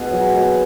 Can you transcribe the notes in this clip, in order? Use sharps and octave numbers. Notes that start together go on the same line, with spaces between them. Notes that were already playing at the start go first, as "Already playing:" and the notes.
Already playing: B2 G#4
F#3
B2